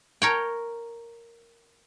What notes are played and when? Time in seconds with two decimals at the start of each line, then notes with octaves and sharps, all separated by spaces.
0.22 A#4 C#5 G5